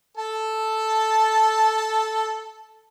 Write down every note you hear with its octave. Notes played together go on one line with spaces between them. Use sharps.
A4 A5